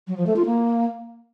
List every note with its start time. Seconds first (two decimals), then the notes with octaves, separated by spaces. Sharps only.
0.08 F#3
0.17 F3
0.27 A3
0.36 F4
0.46 A#3